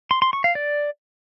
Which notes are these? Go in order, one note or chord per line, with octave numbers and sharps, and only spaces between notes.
C6
C6
C#6
F5
D5